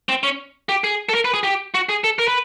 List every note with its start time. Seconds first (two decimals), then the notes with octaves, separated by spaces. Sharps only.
0.09 C4
0.23 C#4
0.69 G4
0.84 G#4
1.09 A4
1.14 A#4
1.25 B4
1.34 G#4
1.43 G4
1.74 F#4
1.89 G#4
2.04 A4
2.19 A#4
2.28 B4